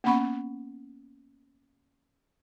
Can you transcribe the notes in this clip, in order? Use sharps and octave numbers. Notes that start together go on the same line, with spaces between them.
A#3 B3 C#4 F#5 B5 C#6